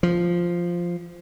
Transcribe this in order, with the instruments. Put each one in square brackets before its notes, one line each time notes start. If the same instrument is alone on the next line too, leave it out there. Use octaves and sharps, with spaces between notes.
[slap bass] F3